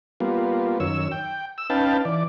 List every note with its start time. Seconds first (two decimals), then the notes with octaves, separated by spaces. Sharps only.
0.20 G3 A#3 B3 F4
0.80 F#2 D#3 C#5 E6
1.11 G5
1.58 E6
1.70 C#4 D#4 B4 F5 G5 A5
2.05 E3 D5